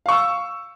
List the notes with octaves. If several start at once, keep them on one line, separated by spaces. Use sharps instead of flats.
F5 C#6 E6